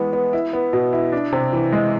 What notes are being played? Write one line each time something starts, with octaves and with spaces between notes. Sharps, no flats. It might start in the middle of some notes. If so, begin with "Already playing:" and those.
Already playing: E3 G#3 B3
B3
E4
B3
B2
E4
D4
C3
E3
G#3